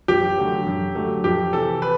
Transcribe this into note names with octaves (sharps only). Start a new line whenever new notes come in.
F#2 G4
D3 F#3 A3
F#2
D3 F#3 A3
F2 G4
C3 E3 A4
B4